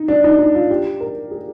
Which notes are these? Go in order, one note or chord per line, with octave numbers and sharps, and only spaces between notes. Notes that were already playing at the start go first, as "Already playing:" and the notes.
Already playing: D#4
D4
D#4
D#4
F4
G4
A#4
G#4